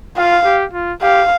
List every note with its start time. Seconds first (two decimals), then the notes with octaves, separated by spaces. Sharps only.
0.17 F4 F5
0.45 G4
0.73 F4
1.02 G4 F5